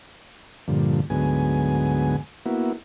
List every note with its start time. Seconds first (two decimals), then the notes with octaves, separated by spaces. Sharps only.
0.68 G2 A#2 D3 F3
1.10 D2 G#2 F#3 B3 G#5
2.46 A#3 B3 E4 F#4